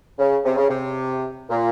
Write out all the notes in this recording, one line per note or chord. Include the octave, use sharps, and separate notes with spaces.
C#3
C3
C#3
C3
A#2